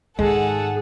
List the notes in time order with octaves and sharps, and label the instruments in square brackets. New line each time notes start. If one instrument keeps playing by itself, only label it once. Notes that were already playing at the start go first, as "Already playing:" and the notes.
[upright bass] G#2 D#3 [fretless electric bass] G#3 [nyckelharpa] G#4 [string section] A4 F#5 A5